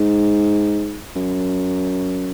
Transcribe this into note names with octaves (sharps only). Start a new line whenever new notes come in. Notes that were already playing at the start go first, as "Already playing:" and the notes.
Already playing: G#2
F#2